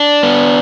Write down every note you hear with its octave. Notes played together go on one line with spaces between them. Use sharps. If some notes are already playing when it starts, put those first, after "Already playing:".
Already playing: D4
B3